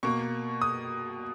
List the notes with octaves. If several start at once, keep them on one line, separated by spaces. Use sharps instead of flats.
B2 A#3 C#6
D#6